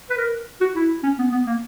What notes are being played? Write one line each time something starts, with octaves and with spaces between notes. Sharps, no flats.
B4
A#4
F#4
E4
C#4
B3
B3
A#3